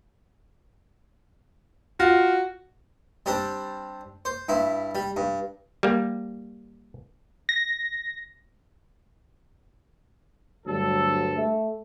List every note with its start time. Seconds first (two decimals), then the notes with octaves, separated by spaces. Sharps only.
2.00 F4 F#4
3.26 G3 C4 D4
4.25 C5
4.49 G2 E4
4.95 G3
5.17 G2
5.83 G3 A#3
7.49 A#6
10.67 D2 G2 F#3 A4
11.37 A3